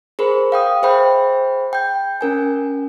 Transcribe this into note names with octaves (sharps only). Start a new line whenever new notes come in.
G#4 A#4 C5 B5
F5 G5 D#6
G#4 C5 E5 G5 B5
G5 G6
C#4 A#4 G#5